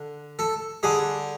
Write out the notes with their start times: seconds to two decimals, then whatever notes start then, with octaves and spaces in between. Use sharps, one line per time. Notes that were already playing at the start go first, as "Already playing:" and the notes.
Already playing: D3
0.39 A4
0.83 D3 G3 G#4